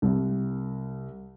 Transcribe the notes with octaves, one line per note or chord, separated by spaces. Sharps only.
C2